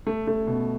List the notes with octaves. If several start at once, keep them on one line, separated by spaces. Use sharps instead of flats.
A3
A3
B2